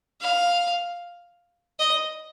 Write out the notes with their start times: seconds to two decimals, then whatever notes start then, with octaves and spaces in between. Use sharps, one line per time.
0.21 F5
1.79 D#5